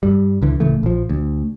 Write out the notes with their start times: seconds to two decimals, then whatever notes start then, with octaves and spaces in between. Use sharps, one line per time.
0.03 G2 G3
0.42 C#2 D3 E3
0.60 D1 C#3 E3 A3
0.83 A#1 F3
1.09 D2